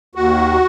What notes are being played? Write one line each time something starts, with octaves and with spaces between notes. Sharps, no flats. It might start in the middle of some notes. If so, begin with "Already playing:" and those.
D#2 F#4